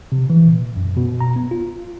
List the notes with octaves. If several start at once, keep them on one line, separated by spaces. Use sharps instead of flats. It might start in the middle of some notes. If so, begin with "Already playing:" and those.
C3
E3
A#2
F#2
B2
A#5
B3
F4